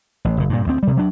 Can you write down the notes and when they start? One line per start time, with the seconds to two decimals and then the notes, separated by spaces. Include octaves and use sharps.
0.25 A1
0.37 F#1 A#2
0.49 G2 A#2
0.67 D2 C4
0.83 C3 G3
0.97 F#3 D4